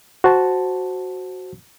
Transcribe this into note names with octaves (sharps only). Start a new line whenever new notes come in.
F#4 C5 A5